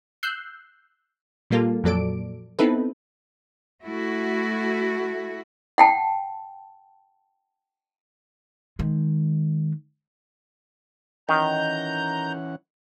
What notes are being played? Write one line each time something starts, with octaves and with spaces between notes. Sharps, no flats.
E6 F#6 G6 C7
A#2 G3 A#3 F4 A4
F2 A#2 F#3 A4 D5 D7
B3 C4 D#4 E4 A4 B4
A3 E4 F#4
F#5 G5 A5
D#3 G#3
D#3 E3 C#4 F#5 A#5 G6